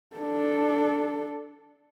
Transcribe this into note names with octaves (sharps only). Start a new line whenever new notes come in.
D4 A4